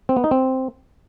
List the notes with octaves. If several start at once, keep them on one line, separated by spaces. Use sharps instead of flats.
C4
B3
D#4
C4